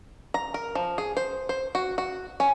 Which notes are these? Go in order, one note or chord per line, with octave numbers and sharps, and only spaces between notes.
A#5
A#4
F3
G#4
C5
C5
F#4
F#4
C#4